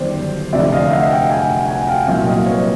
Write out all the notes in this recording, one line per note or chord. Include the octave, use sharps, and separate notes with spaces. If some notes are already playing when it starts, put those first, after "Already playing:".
Already playing: G1 F#2 D#3 G3 C5 D5
F1 F2 D3 D5 E5
D#5 F5
E5 F#5
F5 G5
F#5 G#5
F#5 G#5
F5 G5
C2 A#2 F#3 E5 F#5
D#5 F5
B4 C#5